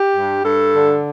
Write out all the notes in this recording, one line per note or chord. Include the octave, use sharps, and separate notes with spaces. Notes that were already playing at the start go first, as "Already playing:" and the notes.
Already playing: G4
G2
G2 A4
D3